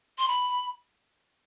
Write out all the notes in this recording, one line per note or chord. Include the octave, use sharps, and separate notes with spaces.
C6
B5